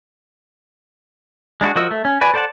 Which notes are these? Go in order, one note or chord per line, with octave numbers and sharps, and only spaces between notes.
G#3 D4 E4 F#4
F3 F#4 A#4 D#5 E6
A3
C#4
F#4 B4 D5 G#5
A4 C5 D5 F#5 A5